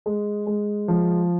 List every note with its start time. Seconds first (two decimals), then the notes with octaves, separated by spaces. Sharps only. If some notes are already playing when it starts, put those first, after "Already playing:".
0.06 G#3
0.47 G#3
0.88 F3